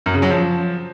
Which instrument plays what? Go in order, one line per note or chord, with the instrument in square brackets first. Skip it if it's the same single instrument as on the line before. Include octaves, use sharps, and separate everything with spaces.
[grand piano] F#2
C#3
F#3
F3